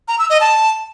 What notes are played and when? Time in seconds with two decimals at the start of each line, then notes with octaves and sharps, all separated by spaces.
0.08 A#5
0.19 E6
0.30 D#5
0.41 A5